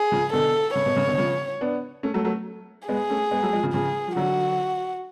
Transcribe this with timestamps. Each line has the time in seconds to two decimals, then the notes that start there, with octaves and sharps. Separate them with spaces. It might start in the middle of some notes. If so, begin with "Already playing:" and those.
Already playing: G#4
0.12 C#3 F3
0.33 B2 D3 A4
0.75 C#3 C#5
0.86 B2
0.96 C#3
1.07 B2 D3
1.18 C#3 F3
1.61 B3 D4
2.03 A3 C#4
2.14 F#3 A3
2.24 F#3 A3
2.88 G#3 B3 G#4
3.10 A3 C#4
3.31 G#3 B3
3.42 F#3 A3
3.53 F3 G#3
3.63 C#3 F3
3.73 C#3 F3 G#4
4.08 F3
4.16 D3 F#3 F#4